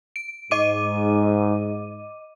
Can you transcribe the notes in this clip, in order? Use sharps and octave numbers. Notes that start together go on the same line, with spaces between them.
D7
G#2 D#5 D6 D#7